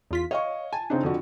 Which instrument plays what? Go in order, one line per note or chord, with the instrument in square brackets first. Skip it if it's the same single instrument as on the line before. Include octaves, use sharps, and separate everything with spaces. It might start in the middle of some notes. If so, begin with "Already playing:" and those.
[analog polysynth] E2 F4 B6
[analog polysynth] C#5 [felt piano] D#5 F5 C#6
[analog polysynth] G#5 [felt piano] A5
[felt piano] C#3 C4 D#4 [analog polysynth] D4
[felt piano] F2 D3 F#4